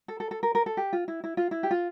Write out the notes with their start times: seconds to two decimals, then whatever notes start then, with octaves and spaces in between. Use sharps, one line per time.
0.08 A4
0.20 A4
0.31 A4
0.43 A#4
0.55 A#4
0.66 A4
0.77 G4
0.93 F4
1.08 E4
1.24 E4
1.37 F4
1.51 E4
1.63 G4
1.71 F4